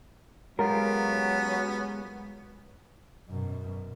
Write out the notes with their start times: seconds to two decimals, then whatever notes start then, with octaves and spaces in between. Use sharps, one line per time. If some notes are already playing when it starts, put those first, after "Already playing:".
0.59 F#3 G#3 B3 C#4 F4 G4 A#4
3.29 F#2 B2